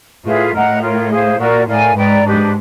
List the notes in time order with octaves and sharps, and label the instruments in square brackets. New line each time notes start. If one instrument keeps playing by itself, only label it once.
[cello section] A2 [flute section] F4 G#4 B4 E5
[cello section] A2 [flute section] A#4 D#5 F#5 A#5
[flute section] F4 A#4 C#5
G#4 C5 F5
[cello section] A#2 [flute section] F#4 A#4 D5
[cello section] A2 [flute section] A#4 D5 F5 G#5
[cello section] G#2 [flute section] B4 D5 G5 A#5
[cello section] G#2 [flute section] D4 G4 B4